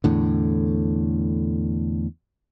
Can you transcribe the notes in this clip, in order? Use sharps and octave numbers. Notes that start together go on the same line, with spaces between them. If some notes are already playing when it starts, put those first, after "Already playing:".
E2 A2 D3